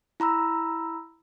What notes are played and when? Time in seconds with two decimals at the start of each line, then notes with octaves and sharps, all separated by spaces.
0.20 E4 A#5 B5 E6